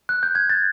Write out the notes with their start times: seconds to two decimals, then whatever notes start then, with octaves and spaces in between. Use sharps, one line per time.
0.09 F#6
0.23 G6
0.35 G#6
0.50 A6